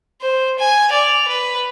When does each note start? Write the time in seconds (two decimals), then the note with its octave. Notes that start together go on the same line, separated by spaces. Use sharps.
0.21 C5
0.59 G#5
0.90 D5 F7
1.28 B4